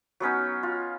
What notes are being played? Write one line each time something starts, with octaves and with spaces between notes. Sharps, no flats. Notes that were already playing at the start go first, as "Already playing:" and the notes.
F#3 B3 C#4 D#4
F4